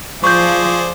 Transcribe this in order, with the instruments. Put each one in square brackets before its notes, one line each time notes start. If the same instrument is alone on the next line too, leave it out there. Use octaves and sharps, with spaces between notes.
[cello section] F3 [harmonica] G#4 C5 D5 [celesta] C#6 G6